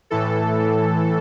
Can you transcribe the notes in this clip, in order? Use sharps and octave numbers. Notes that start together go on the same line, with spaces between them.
A2 E3 A4